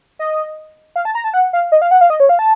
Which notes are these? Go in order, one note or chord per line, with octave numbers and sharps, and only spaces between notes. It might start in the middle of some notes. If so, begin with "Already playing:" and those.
D#5
F5
A5
A#5
A5
F#5
F5
D#5
F5
F#5
F5
D#5
C#5
F5
A5